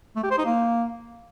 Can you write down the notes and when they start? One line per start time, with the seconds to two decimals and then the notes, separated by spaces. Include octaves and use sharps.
0.16 A3
0.23 G4
0.31 C5
0.38 D#4
0.45 A#3